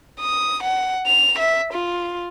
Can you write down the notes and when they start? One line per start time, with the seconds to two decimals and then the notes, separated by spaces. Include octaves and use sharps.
0.21 D#6
0.63 F#5
1.07 F7
1.39 E5
1.73 F4